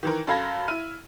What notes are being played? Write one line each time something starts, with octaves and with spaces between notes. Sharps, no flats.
D#3 E3 A#4
F#2 A4 F5 B5 G#6 A#6
E4 F6 D#7